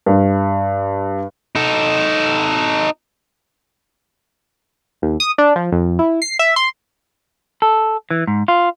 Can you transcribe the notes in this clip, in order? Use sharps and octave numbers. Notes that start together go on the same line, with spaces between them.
G2
D#4 A4
D#2
D#6
D4
F3
F2
E4
C7
E5
C6
A4
E3
G#2
F4